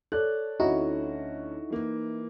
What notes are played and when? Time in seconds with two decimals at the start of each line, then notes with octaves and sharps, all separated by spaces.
0.12 A4 C#5 D5 F#6
0.60 D2 C#4 D#4 E4 F#4
1.70 E3 A#3